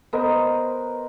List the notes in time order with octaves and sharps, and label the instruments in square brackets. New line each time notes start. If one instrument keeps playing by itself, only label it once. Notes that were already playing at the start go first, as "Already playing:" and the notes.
[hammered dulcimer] B3 A#4 C5 D#5